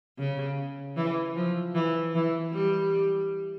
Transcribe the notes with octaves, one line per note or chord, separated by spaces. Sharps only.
C#3
E3
F3
E3
E3
G3